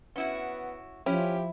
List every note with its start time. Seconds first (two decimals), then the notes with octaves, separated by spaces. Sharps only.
0.16 B3 C#4 E4 F#4
1.06 F3 C#4 E4 G4